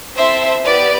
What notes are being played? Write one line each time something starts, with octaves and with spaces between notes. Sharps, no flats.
C4 E4 A4 C5 E5
B3 E4 G4 B4 D5